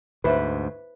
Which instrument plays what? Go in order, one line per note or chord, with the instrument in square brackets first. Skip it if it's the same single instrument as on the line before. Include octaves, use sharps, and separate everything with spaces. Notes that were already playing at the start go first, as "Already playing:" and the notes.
[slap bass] D2 G#2 [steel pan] B4 [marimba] C5 E5